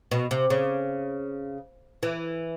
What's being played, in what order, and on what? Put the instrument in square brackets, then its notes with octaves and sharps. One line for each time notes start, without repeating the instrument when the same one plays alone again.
[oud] B2
C3
C#3
E3